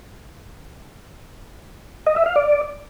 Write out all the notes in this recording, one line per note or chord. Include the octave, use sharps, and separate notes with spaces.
D#5
E5
F5
D5